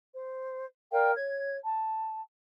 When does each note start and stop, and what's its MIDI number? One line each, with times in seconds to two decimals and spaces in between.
0.13 0.65 72
0.91 1.11 70
0.91 1.11 74
0.91 1.11 77
0.91 1.11 79
1.15 1.57 73
1.15 1.57 92
1.64 2.21 81